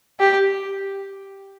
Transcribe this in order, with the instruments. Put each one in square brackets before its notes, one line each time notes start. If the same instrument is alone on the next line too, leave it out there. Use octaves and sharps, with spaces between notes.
[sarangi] G4